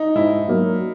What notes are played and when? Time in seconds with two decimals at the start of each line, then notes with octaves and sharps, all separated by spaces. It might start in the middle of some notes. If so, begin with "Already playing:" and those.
Already playing: D#4
0.15 G#2 E4
0.48 F#3 A#3